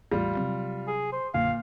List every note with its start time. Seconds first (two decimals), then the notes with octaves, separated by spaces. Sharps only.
0.11 A1 E2 A2 G3 F4
0.37 C3 F#3 C4
0.88 G#4
1.12 C5
1.34 A#1 F#2 A#2 D3 F5